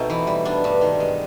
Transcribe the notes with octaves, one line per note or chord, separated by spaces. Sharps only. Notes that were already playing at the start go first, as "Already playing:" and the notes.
Already playing: B2 A3 C4 D#4
E3
G3
B3 D4
G2
D#3
G#3